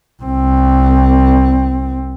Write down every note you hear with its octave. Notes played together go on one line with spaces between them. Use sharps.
C2 C4